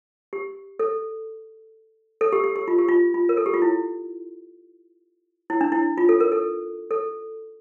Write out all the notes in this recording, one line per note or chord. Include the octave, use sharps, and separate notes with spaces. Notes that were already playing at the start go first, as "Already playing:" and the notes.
G4
A4
A4
G4
G4
G4
F4
G4
F4
F4
A#4
A4
G4
F4
E4
E4
D4
E4
F4
A4
A#4
A4
A4